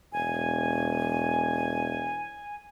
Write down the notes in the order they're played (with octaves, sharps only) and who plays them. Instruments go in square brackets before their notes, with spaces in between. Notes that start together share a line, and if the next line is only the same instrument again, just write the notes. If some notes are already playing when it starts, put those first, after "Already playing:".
[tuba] E1 [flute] G#5